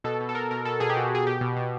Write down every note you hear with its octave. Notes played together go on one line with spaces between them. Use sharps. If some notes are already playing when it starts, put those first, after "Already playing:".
B2 A4
B2
A4
B2 A#4
B2 A#4
B2 A4
B2 G#4
G4
B2 F#4
B2 G#4
B2 G4
B2
B2